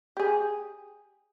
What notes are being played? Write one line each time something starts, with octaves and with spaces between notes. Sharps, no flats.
G4 G#4